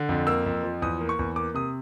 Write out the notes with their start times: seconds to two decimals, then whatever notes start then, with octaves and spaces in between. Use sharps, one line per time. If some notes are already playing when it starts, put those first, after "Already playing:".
Already playing: D3
0.09 F2
0.27 A#3 E6
0.46 F2
0.63 F3
0.82 E2 D#6
1.01 A#3
1.09 C#6
1.19 E2
1.36 A#3 D6
1.54 C3 D#6